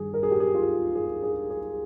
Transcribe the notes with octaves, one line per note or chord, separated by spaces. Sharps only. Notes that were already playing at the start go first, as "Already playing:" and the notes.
Already playing: G2 D#3 G#4
A#4
G#4
G4
G#4
F4
G#4
G#4
G#4